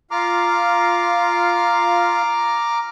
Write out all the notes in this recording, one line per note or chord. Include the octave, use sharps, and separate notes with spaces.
F4 F5 A#5 D6 F6